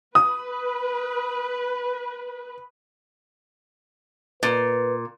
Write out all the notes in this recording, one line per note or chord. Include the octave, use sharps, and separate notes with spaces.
B4 D#6
A#2 B4